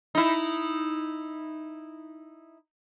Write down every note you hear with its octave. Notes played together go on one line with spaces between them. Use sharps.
D#4 E4